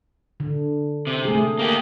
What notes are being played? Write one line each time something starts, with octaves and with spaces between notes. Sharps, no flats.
D3
C3
A3 G#4
A#3 G4